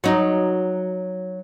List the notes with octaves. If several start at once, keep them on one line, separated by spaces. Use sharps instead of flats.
F#3 D#4